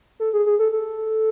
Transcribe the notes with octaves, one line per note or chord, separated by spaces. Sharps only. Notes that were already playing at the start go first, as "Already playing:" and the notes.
A4
G#4
G#4
A4
A4